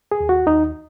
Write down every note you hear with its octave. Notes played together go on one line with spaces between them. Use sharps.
G#4
D#2
F#4
D#2 D#4